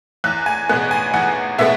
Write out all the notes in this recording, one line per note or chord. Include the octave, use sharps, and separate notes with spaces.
E2 F#6
G#5
B2 G#3 B3 F#6
G#5
E2 F#5
B2 G#3 B3 E5